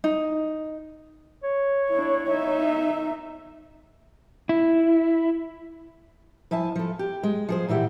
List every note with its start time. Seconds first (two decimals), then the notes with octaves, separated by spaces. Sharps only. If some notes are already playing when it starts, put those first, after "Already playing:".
0.04 D#4
1.44 C#5
1.90 D4 E4
2.30 D#4 E5
4.49 E4
6.51 F3 E4 E5 G#5 A5
6.75 F3 A4
6.99 G4
7.23 G#3
7.49 F3 G#4 C5
7.68 A#2 E3 E4 G4 F#5